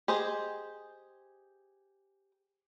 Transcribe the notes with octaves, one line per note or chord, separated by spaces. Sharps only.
G4 G#4 C5 D#5